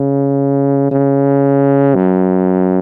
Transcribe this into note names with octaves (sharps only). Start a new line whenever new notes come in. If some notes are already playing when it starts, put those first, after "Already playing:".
Already playing: C#3
C#3
F#2